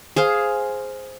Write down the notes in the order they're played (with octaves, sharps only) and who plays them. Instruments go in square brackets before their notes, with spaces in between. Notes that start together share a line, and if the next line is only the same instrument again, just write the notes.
[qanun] G#4 C5 F5